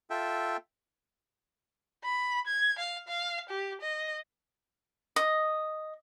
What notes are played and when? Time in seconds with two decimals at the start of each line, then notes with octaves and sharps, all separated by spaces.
0.10 F4 A4 E5 G5
2.04 B5
2.47 G#6
2.79 F5
3.08 F5
3.49 G4
3.81 D#5
5.16 D#5